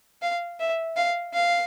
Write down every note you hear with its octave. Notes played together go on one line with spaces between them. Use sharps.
F5
E5
F5
F5